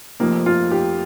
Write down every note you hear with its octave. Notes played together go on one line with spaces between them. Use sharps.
F1 F2 C3 F3 A#3
F4
G4